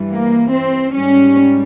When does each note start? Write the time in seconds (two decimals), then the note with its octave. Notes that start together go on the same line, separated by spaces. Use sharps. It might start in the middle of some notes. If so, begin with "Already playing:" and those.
Already playing: G2 E3 G3
0.11 A#3
0.53 C4
0.94 G#2 G3 C#4